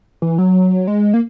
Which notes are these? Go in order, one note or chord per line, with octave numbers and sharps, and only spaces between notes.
E3
F#3
G#3
A#3